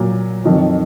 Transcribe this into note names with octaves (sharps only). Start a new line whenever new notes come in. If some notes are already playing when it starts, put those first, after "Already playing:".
Already playing: A#2 F#3
F2 D#3 F#3